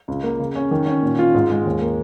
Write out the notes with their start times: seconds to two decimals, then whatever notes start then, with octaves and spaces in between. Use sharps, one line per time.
0.08 C#2
0.24 A#3
0.40 C#3
0.55 C#4
0.71 D#3
0.86 C#4
1.03 A#2
1.19 F4
1.34 G#2
1.50 G#3
1.66 D#2
1.81 A#3